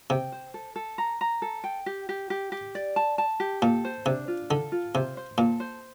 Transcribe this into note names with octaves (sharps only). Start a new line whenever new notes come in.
C3 G5
C5
A4
A4
A#5
A#5
A4
G5
G4
G4
G4
G4
D5
A5
A5
G4
A#2 A4
C5
C3 D4
F4
D3 A4
F4
C3 C5
C5
A#2 A4
C5